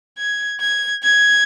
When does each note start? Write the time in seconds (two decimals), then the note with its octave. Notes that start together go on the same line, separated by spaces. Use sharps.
0.18 G#6
0.61 G#6
1.03 G#6